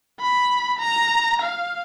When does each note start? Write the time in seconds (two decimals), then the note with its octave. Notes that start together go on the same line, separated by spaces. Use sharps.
0.20 B5
0.79 A#5
1.42 F5